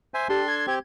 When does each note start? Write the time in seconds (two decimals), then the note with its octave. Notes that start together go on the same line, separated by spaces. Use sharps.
0.14 C5 E5 G#5
0.29 D4 G4 A4 C6
0.48 G#6
0.67 C4 G4